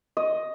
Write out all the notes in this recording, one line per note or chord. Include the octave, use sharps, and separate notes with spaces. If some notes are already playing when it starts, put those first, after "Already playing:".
D#5